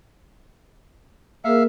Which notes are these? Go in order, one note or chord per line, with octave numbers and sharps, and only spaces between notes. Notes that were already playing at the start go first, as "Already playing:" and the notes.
A#3 G#4 A#4 E5 F5